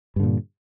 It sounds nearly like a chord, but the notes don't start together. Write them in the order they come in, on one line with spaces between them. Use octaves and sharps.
G2 D3 A#2